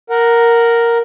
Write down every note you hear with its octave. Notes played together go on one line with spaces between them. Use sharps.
A#4 F#5